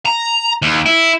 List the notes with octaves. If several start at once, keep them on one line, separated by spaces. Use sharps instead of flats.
A#5
D#2
E4